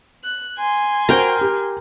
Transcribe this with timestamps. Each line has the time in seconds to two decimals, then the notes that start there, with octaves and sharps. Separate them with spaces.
0.24 F#6
0.58 G#5 C6
1.09 F#4 A#4 C5 G5
1.41 G4